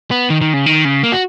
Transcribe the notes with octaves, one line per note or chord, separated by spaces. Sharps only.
B3
D#3
D#3
C#3
D#3
C#3
A#3
F#4